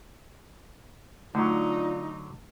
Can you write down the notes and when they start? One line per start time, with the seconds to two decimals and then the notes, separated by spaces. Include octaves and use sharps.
1.35 D3 F#3 A3 D4 D#4 F4